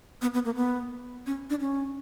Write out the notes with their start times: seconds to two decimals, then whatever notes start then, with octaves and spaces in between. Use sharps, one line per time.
0.22 B3
0.34 B3
0.45 A#3
0.56 B3
1.26 C#4
1.50 D4
1.60 C#4